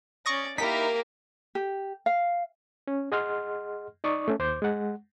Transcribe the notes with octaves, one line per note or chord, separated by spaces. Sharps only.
C#4 D5 C#6 D#6 A#6
A#3 D#4 E4 G4 A#4 B6
G4
F5
C#4
G#4 D#5 F#5 C6 F6
D#4 D5 C#6 D#6
A3 C#4
D#2 C5 D6 G6
G#3 F#5